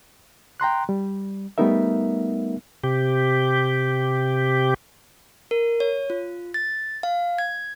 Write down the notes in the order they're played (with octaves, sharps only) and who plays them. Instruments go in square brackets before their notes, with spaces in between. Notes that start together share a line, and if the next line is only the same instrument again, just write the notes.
[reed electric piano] G5 A#5 C6 F#6
G3
G3 A3 B3 D#4 A#4 E5
[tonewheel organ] C3 G4
[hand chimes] A#4
C#5
F4
A6
F5
G#6